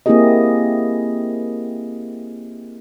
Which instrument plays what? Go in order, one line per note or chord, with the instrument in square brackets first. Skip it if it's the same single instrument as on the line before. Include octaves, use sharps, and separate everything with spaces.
[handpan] A#3 C4 E4 G4 G#4 D#5